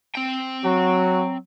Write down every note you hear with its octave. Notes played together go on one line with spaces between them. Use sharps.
C4 G5
F#3 F#4